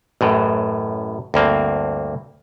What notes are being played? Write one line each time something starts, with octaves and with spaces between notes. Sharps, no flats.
A1 F#2 A2
D2 G2 A#3 C4